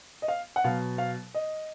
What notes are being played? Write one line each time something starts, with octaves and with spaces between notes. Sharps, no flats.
D#5
F5
F#5
B2 F#3 F5
F5
D#5